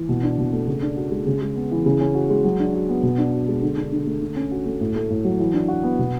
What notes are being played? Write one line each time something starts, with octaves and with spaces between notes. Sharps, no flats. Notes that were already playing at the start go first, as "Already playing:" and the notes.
Already playing: E3
B2
D4
B2
A3
C#3
D4
F#4
G#3
C#3
G#3
B3
E3
C#3
C#4
F#4
G#3
F#3
D4
F#4
B3
B2
D4
F#4
G#3
D3
D4
D3
A3
D3
C#4
F#4
A3
A2
A3
A2
F#3
E3
D4
F#4
B3
B2